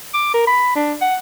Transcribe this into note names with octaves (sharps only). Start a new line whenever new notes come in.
D6
A#4
B5
D4
F#5